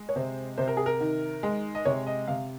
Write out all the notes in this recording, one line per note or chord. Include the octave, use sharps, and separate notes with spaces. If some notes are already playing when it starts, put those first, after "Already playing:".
Already playing: G#3
C#5
C3 C5
C3 C5
A#4
G#4
A#4
D#3
G#3
D#5
C3 C#5
D#5
C3 F5